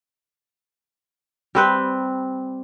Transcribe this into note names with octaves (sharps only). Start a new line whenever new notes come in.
G3 C4 B4